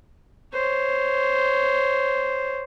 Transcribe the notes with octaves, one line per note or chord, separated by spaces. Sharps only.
C5 C#5